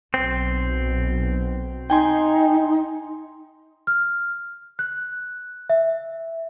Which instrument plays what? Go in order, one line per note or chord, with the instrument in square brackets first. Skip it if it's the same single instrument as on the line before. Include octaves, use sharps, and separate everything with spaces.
[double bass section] B1 B2 [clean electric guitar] C4
[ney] D#4 [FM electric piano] G5 G#5 C6
[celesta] F6
F#6
E5